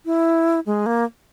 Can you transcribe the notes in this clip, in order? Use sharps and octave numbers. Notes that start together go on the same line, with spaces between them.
E4
G#3
A#3